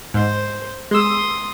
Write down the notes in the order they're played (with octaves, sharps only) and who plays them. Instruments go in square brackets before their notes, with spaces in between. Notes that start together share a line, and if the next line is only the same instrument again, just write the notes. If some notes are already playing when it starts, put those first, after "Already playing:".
[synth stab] G#2 [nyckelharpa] C5
[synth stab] G#3 E6 [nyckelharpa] C6 D#6